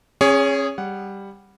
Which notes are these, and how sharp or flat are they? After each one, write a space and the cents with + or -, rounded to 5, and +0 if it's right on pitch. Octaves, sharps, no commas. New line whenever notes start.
C#4 -30 G#4 -10 C#5 +20
G3 +5 F#5 +0